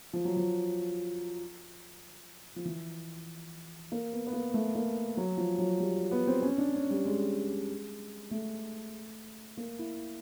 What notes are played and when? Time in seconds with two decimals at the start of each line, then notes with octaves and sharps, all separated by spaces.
0.13 F3
0.25 F#3
0.37 F3
2.56 F3
2.65 E3
3.92 A#3
4.12 B3
4.26 B3
4.33 A#3
4.54 A3
4.75 A#3
5.17 F#3
5.37 F3
5.58 F#3
5.80 G3
6.11 B3
6.27 C4
6.43 C#4
6.58 D4
6.74 C#4
6.90 G3
7.05 G#3
8.31 A3
9.57 A#3
9.79 E4